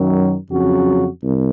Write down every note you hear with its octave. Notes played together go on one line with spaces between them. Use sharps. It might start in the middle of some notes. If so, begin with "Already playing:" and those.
Already playing: F#2 D#3 F#3
F2 C#3 F#3 C#4 F#4
C2